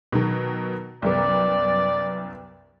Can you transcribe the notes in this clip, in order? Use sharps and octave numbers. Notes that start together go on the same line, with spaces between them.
B2 D#3 F#3
C2 F#2 B3 D5